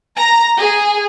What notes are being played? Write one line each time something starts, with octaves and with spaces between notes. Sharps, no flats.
A#5
G#4